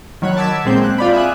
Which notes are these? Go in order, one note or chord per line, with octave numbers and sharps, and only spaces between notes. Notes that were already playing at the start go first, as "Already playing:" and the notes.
D#3 F#3 C#5 B5 F#6
A5 D6 E6 G#6 B6
A#2 G#3 C4 G6
F#6
F4 D5 B5
E5 G#5 D#6 F#6